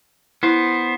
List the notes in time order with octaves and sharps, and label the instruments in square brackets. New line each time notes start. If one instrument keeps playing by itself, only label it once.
[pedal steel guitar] B3 C5 [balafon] E4